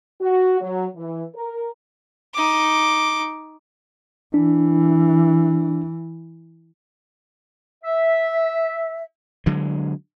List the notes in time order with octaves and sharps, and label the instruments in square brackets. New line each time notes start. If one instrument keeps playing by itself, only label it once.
[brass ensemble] F#4
F#3
E3
A#4
[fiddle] D#4 D6
[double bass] E3 [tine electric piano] D4
[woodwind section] E5
[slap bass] D3 F#3 G#3